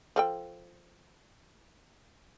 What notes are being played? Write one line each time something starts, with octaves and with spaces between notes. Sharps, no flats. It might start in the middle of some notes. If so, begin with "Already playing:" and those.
F3 A4 G5